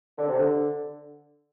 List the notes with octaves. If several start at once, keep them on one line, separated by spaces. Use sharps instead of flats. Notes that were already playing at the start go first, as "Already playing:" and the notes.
D3
C3
D3